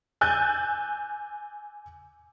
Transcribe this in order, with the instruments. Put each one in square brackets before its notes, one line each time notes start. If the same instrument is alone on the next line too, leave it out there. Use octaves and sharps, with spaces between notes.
[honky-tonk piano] G#5 E6 F#6 G6 A6